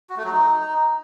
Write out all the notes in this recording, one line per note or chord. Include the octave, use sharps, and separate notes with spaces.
F#4
A3
F#3
D#4